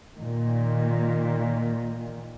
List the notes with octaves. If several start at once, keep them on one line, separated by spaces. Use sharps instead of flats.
A#2 D#3